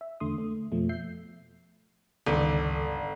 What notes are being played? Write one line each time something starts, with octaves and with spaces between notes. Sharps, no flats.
E5
E2 D3 A3 C6 D#6
A3
F2 B2 F3 A3
E5 G6 C7
G1 C#2 D3 D#3 A4